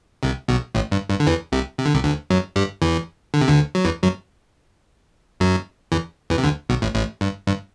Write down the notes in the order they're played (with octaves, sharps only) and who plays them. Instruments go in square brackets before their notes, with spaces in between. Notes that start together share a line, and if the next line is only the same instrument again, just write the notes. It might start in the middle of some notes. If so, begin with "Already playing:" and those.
[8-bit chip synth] C2 C3
B1 B2
A1 A2
G2
G2
D3
E2 E3
C2 C3
C3
D3
C2 C3
D2 D3
F#2 F#3
G2 G3
E2 E3
D3
C3
D2 D3
F#3
E2 E3
F#2 F#3
F#2 F#3
E2 E3
E2 E3
C3
D2 D3
B1 B2
A1 A2
A1 A2
G2
G2